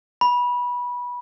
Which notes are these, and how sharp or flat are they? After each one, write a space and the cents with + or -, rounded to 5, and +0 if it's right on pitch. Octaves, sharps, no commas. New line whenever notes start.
B5 -20